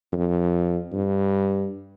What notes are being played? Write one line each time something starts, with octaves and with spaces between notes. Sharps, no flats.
F2
G2